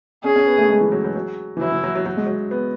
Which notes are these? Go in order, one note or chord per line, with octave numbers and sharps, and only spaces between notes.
C#4 G#4
C#4
B3
A3
G#3
E3
F#3
F#3
F#3
E3
F#3 E4
E3
F#3
F#3
F#3
G#3
F#3
B3